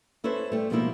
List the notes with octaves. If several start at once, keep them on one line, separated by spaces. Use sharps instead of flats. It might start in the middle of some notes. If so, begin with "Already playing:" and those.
C#4 E4 A4 B4 C5
G3 A3
B2 F3 G#3 A#3 D#4 E4